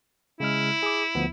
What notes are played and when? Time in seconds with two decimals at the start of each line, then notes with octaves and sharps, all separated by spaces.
0.40 C#3 G#3 E4 F6
0.83 G#4 D6
1.15 D2 F3 B3